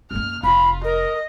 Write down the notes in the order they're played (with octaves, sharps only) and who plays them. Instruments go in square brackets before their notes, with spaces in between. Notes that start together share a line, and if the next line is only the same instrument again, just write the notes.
[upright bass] F#2 A#3 [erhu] F6
[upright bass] F1 [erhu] F4 [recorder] B5
[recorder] A#4 [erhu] D#5